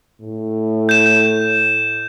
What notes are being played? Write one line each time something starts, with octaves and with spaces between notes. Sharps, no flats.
A2
G6 E7